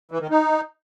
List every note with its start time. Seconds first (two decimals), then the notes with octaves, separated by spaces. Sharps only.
0.11 E3
0.21 D#3
0.30 D#4